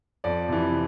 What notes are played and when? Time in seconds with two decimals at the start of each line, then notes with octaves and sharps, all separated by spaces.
0.24 F2 D5
0.49 C3 E3